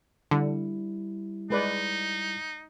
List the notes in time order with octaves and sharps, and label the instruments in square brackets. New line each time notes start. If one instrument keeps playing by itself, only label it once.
[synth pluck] D3 [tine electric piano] G3 E4
[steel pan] G#3 B4 D5 [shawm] D#4